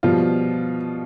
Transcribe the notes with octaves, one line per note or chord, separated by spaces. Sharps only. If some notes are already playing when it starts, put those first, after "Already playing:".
B2 F3 G3 F4